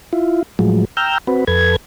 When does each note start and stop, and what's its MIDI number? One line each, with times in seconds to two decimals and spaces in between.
0.13 0.43 64
0.13 0.43 65
0.59 0.85 45
0.59 0.85 53
0.59 0.85 54
0.59 0.85 56
0.97 1.18 79
0.97 1.18 82
0.97 1.18 88
0.97 1.18 89
0.97 1.18 91
1.27 1.44 60
1.27 1.44 66
1.27 1.44 71
1.47 1.76 41
1.47 1.76 69
1.47 1.76 71
1.47 1.76 92